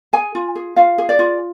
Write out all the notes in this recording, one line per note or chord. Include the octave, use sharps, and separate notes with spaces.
G#4 G#5
F4
G#4
F4 F5
G#4
D5
F4